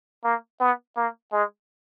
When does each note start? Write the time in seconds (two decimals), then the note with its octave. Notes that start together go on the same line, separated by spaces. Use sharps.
0.24 A#3
0.60 B3
0.96 A#3
1.32 G#3